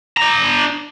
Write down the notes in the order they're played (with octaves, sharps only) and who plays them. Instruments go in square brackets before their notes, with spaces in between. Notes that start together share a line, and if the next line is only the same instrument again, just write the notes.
[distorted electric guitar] D4 A#5